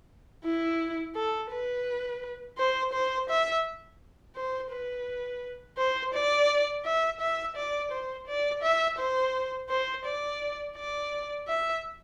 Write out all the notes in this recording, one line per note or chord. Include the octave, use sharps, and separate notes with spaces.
E4
A4
B4
C5
C5
E5
C5
B4
C5
D5
E5
E5
D5
C5
D5
E5
C5
C5
D5
D5
E5